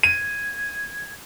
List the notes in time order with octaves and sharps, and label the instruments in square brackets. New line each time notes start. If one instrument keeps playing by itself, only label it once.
[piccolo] G#6 [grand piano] D#7